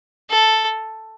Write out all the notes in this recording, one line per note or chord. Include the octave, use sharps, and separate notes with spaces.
A4